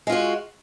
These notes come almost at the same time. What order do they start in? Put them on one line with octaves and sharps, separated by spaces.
G#3 F4 F#4